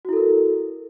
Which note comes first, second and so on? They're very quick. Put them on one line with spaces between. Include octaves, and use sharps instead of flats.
F#4 E4 A4 A#4